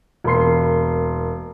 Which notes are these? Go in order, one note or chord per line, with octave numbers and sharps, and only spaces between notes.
E1 A#3 C6 C7